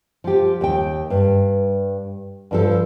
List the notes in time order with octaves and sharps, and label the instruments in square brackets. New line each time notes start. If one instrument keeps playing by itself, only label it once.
[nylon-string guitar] F3 G4
D#2 G5
G2
G2 F3 A4